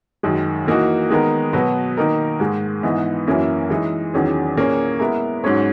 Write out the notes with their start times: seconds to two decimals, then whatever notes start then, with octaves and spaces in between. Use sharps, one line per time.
0.23 F#2 D#3 G#3
0.66 E3 A#3 D#4 F#4
1.10 D#3 G#3 B3 D#4 A#4
1.53 B2 F#3 B3 F#4 B4
1.97 D#3 A#3 D#4 A#4
2.40 G#2 D#3 G#3
2.83 G#2 E3 B3 D#4
3.27 F#2 E3 A#3 C#4 E4
3.70 E3 G#3 D#4
4.14 E2 D#3 F#3 C#4 G#4
4.56 A#2 A#3 C#4 G#4 C#5
5.00 G#3 B3 E4 A#4
5.44 G#2 F#3 C#4 G#4 C#5